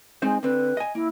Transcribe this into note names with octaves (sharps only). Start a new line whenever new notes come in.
G#3 C4 D#4 C5
D3 C4 B4
D#5 G#5
A#3 E4